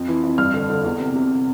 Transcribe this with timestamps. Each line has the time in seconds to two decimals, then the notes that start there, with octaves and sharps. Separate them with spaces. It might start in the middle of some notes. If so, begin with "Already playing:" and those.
Already playing: F2
0.08 E3
0.23 F2
0.38 G2 F6
0.54 D3
0.70 D3
0.84 E2
1.00 C3
1.15 C3